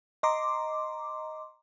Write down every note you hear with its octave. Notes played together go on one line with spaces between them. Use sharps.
D#5 A#5 C6 D6